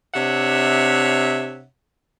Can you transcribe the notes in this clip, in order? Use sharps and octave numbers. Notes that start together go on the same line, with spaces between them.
C3 D4 C#5 E5 F#5